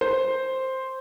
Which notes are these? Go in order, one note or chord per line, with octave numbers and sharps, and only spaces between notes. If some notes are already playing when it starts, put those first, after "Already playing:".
C5